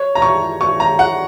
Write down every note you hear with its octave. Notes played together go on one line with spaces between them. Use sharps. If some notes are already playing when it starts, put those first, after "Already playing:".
Already playing: C#5
A#5
C#6
C#6
A#5
F#5